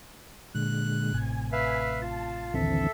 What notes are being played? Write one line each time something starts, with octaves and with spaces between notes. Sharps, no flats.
A#2 D3 G#3 F#6
A1 A2 C3 G#5
B4 E5 F5
F4 A5
A#1 D#2 D3 E3 C4 A4 E5